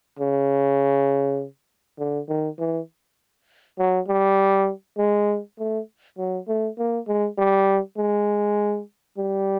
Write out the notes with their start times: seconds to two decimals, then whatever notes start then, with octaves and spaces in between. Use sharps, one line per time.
0.19 C#3
1.99 D3
2.28 D#3
2.59 E3
3.79 F#3
4.08 G3
4.98 G#3
5.59 A3
6.18 F#3
6.48 A3
6.78 A#3
7.07 G#3
7.38 G3
7.97 G#3
9.18 G3